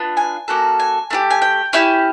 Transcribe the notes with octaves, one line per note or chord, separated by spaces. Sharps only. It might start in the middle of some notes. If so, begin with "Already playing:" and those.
Already playing: B3 D4 F4
G#5
A#3 C#4 F#4 A4
G#5
A3 D4 G4
G#5
G5
C#4 E4 G4